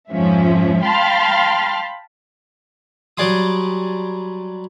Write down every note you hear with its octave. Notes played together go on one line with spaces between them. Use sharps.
F2 G#2 F3 C#4 E5
F5 G5 A5 B5 C6 F6
F#3 G3 D5 G#5 C6 D#6